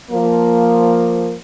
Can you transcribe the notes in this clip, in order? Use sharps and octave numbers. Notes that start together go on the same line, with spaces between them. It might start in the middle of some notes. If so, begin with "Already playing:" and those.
F3 A#3